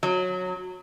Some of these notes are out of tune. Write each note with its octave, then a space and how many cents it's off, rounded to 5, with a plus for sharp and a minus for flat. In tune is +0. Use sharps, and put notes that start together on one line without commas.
F#3 -15